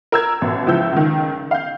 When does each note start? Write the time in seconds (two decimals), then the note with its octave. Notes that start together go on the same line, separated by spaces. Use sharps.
0.12 A#4 E6 G#6
0.41 A1 B2
0.66 C#2 F3 E4 E6 G6
0.93 C#2 D#3
1.51 F5 G6